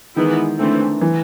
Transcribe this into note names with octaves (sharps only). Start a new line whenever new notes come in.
D#3 E3 G#3 B3 E4
D3 E3 A3 C4
E3